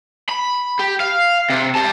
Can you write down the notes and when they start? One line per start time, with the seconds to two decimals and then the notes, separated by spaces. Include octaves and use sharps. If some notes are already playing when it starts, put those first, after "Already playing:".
0.29 B5
0.80 G4
1.00 F5
1.50 C3
1.75 G4 A5